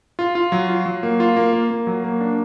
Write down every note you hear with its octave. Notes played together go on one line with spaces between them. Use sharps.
F4
F4
F#3
F4
F#3
A#3
F4
A#3
A#3
A#3
F#3
A#3
D4